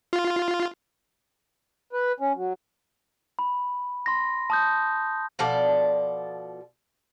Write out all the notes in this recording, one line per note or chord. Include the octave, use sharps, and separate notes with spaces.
F4
B4
C#4
F#3
B5
C6 A#6
A5 D#6 G6
B2 F3 A4 D5